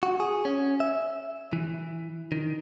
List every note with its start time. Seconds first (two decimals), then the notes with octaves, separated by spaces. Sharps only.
0.03 F#4
0.20 G#4
0.45 C#4
0.80 E5
1.53 E3
2.32 D#3